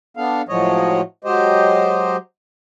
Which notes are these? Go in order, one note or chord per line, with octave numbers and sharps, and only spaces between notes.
B3 D4 A4 F5
A2 F3 F#3 G#3 C#5 D#5
F#3 G#3 G4 C5 D#5